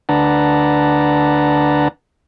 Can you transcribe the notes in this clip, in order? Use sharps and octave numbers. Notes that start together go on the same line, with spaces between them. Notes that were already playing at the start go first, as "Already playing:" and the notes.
D2 D4 B4 F#5 A5 A#5